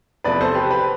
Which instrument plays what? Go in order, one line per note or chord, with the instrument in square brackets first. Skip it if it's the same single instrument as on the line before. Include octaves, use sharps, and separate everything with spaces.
[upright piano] E2 C3 F3 A3 B4 D5
A4 C5
G4 B4
G4 B4